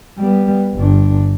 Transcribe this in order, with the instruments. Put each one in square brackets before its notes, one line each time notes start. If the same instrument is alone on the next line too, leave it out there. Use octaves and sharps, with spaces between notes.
[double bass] G3 B3
G1 D4